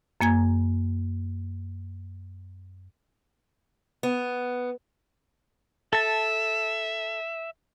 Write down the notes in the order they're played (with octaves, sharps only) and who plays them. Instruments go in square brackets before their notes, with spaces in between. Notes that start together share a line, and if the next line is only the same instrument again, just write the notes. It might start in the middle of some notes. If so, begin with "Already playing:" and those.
[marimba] F#2 A#3 G#5 G#6
[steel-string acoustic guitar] B3
[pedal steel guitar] A4 A5 [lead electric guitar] E5